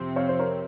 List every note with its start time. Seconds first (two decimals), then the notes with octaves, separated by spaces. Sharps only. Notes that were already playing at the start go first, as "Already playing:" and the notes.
Already playing: F2 C3 F3 C4
0.16 C#5 F5
0.29 C5
0.39 A#4 C#5